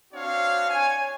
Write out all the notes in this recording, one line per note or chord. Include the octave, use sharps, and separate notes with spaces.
C4 D4 F#4 C#5 F5
C#5 G#5